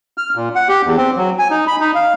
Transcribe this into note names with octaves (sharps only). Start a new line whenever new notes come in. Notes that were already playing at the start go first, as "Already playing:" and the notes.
F6
A#2
F#5
G4
E2
C4
F#3
G#5
D#4
B5
D#4
F5